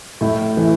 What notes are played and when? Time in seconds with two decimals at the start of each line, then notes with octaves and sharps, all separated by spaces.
0.21 A2 E4
0.57 E3